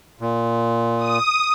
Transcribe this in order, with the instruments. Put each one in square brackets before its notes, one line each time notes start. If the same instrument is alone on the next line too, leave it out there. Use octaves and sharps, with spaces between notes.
[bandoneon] A#2
[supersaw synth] D#6